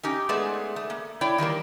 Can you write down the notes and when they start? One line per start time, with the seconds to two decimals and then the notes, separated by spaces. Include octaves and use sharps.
0.03 C#4 D#4 G4
0.29 G#3 A3 B3 G#4 D5
0.76 A3
0.90 A#3
1.21 E4 C#5 D5 G5
1.38 D#3 E3 G3 A#3